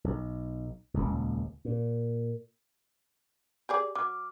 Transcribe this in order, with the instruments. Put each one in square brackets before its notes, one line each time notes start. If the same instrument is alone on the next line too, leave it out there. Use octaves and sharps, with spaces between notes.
[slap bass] B1
D#1 G#1 C#2
A#2
[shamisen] G4 G#4 D5
[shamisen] F#3 [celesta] D6 F6